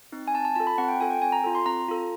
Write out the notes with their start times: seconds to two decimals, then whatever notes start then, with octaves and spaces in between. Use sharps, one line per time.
0.12 C4 D#4
0.28 G#5
0.34 C4 A5
0.45 A5
0.56 F4 A4 A5
0.67 B5
0.78 C4 F#5
0.88 G5
1.00 F4 A4 G#5
1.11 G5
1.22 C4 G#5
1.32 A#5
1.44 F4 A4
1.55 C6
1.66 C4 A#5
1.88 F4 A4